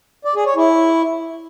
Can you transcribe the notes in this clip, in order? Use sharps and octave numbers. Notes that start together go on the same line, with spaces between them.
D5
G#4
C#5
E4